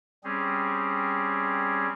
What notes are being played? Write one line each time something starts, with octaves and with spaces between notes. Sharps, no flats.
G3 C4 C#4 G#4